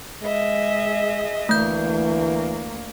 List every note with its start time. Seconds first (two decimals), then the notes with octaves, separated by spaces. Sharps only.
0.23 G#3 G#4 D#5 E5
1.49 D2 E3 A3 A#3 G6